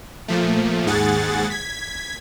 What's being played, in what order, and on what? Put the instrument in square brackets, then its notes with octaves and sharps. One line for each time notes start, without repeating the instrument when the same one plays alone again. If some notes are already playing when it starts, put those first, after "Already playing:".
[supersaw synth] A#2 F3 A3
D#2 G#2 G#4 F#5 A6
G#6 B6